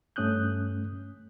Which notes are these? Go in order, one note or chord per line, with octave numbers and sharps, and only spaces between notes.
G2 A3 C#4 D#6 F#6 G6